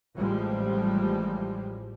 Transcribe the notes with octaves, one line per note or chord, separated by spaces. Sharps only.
A1 F3 G3 G#3